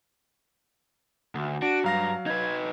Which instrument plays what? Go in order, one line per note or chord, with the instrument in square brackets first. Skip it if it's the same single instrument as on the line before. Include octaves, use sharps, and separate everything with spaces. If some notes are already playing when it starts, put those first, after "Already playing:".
[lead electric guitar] D2
[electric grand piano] D4 [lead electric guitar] F#4 [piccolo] D7
[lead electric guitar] G2 [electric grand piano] F#3 F5 A#6 [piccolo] A#5
[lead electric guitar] D#4 B4 [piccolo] G#6